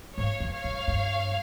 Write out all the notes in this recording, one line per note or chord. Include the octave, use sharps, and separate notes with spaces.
G#2 C#5 F5
F2
C#5 F5
G2
G2